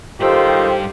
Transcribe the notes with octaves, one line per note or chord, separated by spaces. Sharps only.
G2 D#3 F4 G4 A4 C5 G5